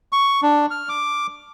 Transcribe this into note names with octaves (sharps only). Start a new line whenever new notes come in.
C#6
D4
F6
D6